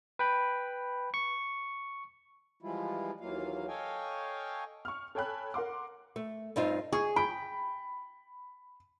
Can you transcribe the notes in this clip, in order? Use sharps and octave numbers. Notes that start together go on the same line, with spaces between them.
B4 G5 B5
C#6
E3 F3 G3 G#3 E4 F4
D#2 E3 F#3 A#3 F4 F5
A4 C#5 D#5 F5 G5 G#5
C#6 F6
A4 C#5 G5 G#5 B5 F#6
A#4 F#5 C6 D6
A3
G2 C4 D#4 F4
G#4 C#6
G5 B5